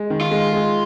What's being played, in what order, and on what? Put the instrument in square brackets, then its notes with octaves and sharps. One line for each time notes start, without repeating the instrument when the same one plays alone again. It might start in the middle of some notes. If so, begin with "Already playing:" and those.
Already playing: [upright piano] G#3
D#3
[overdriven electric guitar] F4
[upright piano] G#3
G#3